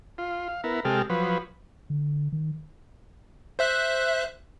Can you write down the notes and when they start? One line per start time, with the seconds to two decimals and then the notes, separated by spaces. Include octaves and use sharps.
0.18 F4
0.48 F5
0.64 B3 E4 A#4
0.85 C3 G#3 G4 A4 F6
1.10 F3 F#3 B4
1.90 D3
2.32 D#3
3.59 C5 E5 F#6